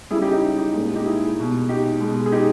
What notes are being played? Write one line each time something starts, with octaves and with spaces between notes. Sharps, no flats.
C#3 G3 E4 G#4
D#4 G4
D#4 G4
D#4 G4
A#2 G#3
D#4 G4
E4 G#4
B2 G#3
D#4 G4
B2 G#3
G#4
D#4 G4